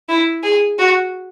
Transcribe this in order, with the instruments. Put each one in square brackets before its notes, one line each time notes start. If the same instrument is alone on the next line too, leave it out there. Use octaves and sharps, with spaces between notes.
[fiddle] E4
G#4
F#4